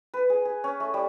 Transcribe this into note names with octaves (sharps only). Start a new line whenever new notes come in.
B4
G#4
G#4
C#4
A3
G3